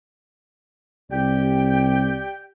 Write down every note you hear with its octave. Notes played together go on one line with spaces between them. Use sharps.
C2 G4 D5 G5